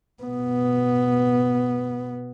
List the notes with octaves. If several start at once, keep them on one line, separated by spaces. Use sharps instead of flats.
B2 B3